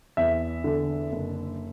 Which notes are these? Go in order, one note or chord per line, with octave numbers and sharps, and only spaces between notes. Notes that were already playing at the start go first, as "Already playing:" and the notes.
E2 E5
D3
F#1